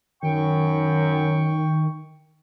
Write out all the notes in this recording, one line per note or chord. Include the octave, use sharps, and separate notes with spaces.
F#2 D#3 G5 C#6